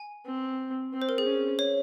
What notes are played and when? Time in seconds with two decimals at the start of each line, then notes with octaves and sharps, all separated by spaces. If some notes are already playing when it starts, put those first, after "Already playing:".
Already playing: G#5
0.26 C4
0.93 C4
1.02 C5
1.09 A#4
1.18 G#4
1.26 C#4
1.59 C#5